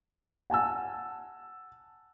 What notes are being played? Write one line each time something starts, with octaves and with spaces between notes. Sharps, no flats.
F#5 G#5 A5 E6